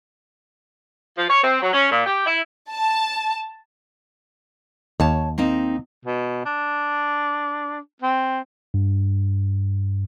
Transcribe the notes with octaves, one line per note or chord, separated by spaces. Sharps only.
F3
C#5
C4
F#3
C#4
A#2
G4
E4
A5
D#2 C#5 A5
A#3 C4 D#4
B2
D4
C4
G2